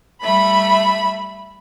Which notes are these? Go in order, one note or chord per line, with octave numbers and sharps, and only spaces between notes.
G3 A3 E5 B5